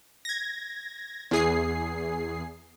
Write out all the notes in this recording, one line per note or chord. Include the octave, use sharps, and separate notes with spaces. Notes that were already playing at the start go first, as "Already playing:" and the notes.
G#6 A#6
E2 G#4 C7